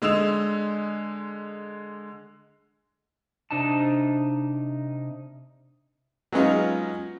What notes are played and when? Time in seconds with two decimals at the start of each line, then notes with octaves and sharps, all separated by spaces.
0.02 D3 G#3 D#6 E6 E7 F7
3.51 C3 D4 D#4 A5
6.32 F#3 G#3 B3 C#4 D#4 F4